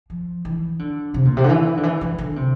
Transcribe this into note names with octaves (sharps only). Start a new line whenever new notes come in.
F3
E3
D3
C3
A#2
C3
D3
E3
D3
E3
E3
D3
C3